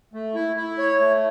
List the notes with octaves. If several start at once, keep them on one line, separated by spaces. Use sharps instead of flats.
A3
E4
E4
C#5
A3